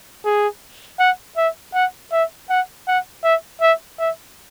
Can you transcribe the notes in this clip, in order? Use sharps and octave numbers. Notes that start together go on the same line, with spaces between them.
G#4
F#5
E5
F#5
E5
F#5
F#5
E5
E5
E5